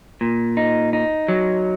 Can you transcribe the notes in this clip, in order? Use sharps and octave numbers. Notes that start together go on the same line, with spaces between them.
A#2
D#4
D#4
F#3